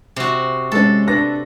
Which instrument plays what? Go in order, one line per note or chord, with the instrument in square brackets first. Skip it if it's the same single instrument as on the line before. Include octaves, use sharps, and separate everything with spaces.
[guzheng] C3 F#4
[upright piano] G#3 C#4 [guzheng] A4
[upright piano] D4 B4 A#6